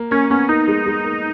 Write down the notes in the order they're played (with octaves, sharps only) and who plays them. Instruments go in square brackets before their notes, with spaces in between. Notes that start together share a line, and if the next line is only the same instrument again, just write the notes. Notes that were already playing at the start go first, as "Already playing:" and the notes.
Already playing: [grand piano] A#3
[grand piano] A#3 [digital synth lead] C#4
[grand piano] B3 [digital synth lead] C#4
[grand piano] A#3 [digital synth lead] D#4
[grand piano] G#3
G#3
A#3